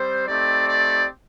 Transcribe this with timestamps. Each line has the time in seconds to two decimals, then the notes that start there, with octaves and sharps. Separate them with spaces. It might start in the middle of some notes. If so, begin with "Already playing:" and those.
Already playing: G3 C4 C5
0.27 A3 C4 D#4 G4 D5
0.68 D5